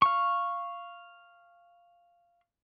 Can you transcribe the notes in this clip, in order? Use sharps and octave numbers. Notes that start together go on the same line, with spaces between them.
F5 C#6